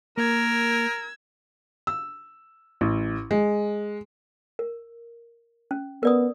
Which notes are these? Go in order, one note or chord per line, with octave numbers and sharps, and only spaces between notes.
A#3 A#4 E6 G#6
E6
A1
G#3
A#4
C#4
B3 A#4 D5 D#6